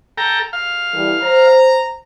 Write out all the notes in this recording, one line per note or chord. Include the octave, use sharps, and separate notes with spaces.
A4 G5 A#5
F5
E3 G3 A4
C5 A#5